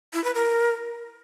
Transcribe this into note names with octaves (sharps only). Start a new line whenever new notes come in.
E4
B4
A#4